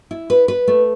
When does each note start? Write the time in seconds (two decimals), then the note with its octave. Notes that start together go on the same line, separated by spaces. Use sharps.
0.11 E4
0.30 B4
0.48 B4
0.68 A3